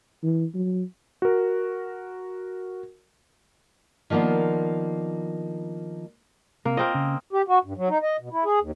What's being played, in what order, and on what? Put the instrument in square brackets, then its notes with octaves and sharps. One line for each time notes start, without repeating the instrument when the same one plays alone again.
[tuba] E3
F#3
[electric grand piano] F#4 A#4
[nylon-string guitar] D#3 F3 A#3 B3 D4
[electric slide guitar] C3 [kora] A#3
[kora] A#3 C4 D#5 [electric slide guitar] F4
[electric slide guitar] C#3
[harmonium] G4
F#4
G2
F#3
D#4
D#5
B2
E4
G#4
D#2